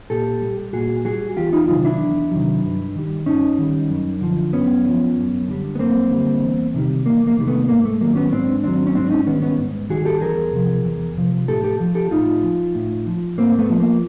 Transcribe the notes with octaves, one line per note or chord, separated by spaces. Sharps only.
A#2 G4 A4
G3
A#2 F#4 G#4
G3 F#4 G#4
E2 F4 G4
D#4 F4
C3 D#3 F#3 D#4 F4
D4 E4
E2
C3 D#3 F#3
G2
D#3 G3
G2 C#4 D#4
D#3 G3
F#2
D3 F3
F#2 B3 C#4
D3
F3
F#2
D3 G3
B3
F#2 A#3 C4
D3 G3
E2
C3 D#3 G3
E2 A#3
A#3
C3 D#3 G3
A3 B3
G#2 A#3
A3
D#3 F#3 A#3
B3 C#4
G#2 C4 D4
D#3 F#3 C4 D4
C#4
G#2 C4 D4
C#4 D#4
D#3 G3 B3 C#4
B3 C#4
G#2
D#3 G3 F#4 G#4
G4 A4
E2 G#4 A#4
C3 F3
E2
C3 F3
A2 G4 A4
G4 A4
F3
G4 A4
A2 D#4 F4
F3
A2
F3
A2 A#3 C4
A3 B3
F3
A#3